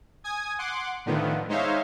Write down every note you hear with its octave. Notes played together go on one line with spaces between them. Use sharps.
G#5 D#6 G#6
F#5 C6 D6
A2 D3 D#3 F3 B3
G#3 D#4 C5 C#5 E5 F5